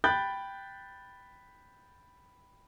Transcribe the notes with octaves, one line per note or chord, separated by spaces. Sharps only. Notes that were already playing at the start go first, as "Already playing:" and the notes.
G5 B5 F#6 G6 A6